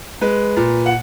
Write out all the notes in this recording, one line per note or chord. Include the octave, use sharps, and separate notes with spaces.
G#3 B4
A#2
F#5